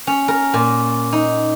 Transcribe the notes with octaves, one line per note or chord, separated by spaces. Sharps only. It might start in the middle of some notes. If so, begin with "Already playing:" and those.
C#4
A#4
A#2
D#4